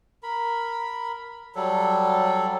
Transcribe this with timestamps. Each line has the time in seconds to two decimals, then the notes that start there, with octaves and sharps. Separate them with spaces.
0.23 A#4 B5
1.55 F#3 G3 A4